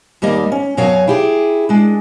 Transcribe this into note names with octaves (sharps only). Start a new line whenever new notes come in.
D#2 G3 A#3 D#5
C#4
F#2 B2 F#3 C#5 F5 G#5
E4 G4 G#4
G#3 D4